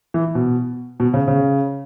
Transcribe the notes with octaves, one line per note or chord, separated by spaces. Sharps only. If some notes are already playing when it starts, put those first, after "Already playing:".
E3
B2
B2
C#3
C#3